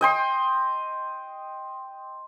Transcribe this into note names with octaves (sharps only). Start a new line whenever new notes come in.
D#5 G5 C6